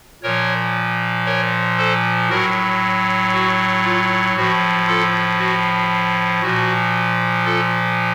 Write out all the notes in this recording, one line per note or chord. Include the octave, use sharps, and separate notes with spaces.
A#2 F3 A#4 C#5
A#4 C#5
A4 C5
A2 F#3 F#4 A#4
F#4
F4
A2 F3 F#4
F4 A4
F#4
A#2 F3 F#4
F4 A4